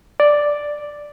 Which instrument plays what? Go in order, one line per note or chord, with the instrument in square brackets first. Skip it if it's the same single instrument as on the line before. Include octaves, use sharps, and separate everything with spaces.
[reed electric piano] D5